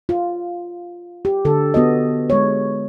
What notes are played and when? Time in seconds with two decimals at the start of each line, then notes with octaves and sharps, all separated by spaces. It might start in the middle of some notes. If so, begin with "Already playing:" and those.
0.09 F4
1.25 G4
1.45 D3 A4
1.74 B3 F#4 D#5
2.30 G#3 C#5